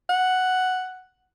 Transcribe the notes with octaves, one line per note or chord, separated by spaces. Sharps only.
F#5